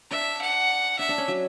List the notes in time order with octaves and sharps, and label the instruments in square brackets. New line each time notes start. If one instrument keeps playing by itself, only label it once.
[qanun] D4 [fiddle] E5
[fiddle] F#5
[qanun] D4 [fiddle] E5
[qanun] D4
C#4
F#3